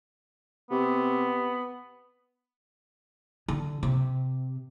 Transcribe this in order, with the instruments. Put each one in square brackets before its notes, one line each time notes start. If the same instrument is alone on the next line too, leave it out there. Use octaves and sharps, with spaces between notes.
[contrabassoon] C3 [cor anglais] B3
[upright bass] D3
C3